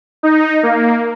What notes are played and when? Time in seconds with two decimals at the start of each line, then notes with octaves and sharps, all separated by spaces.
0.23 D#4
0.63 A#3